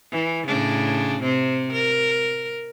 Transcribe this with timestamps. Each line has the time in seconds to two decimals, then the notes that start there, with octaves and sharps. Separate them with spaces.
0.11 E3
0.47 A2 C#3 D4
1.22 C3 C4
1.73 A#4